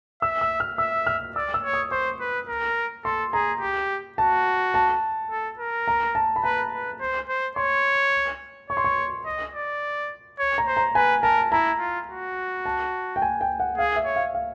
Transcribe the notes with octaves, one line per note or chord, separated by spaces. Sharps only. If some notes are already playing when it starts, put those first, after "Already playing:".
E5 E6
E6
F6
E5 E6
F6
D5 E6
E6
C#5
D#6
C5 C#6
B4
A#4
A4 C6
G#4 A#5
G4
F#4 A5
A5
A4
A#4
A#5
A5
B5
B4 A#5
B4
C5
C5
C#5 C6
C#5 C#6
C6
C#6
D#5
D5
C#5
A#5
C5
A#5
B4 G#5
A#4 A5
E4 A#5
F4
F#4
A5
G5
G#5
G5
F#5
G#4 F5
E5
C#5
F5
F5